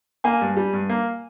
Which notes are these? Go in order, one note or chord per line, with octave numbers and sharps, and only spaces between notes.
A#3 G#5
G2
G3
G2
A#3